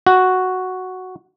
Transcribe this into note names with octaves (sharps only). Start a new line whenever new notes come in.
F#4